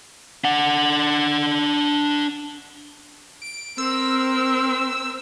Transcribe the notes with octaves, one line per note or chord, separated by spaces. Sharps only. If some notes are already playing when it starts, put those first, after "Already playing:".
D4 F#5
D7
C4 A#4 E6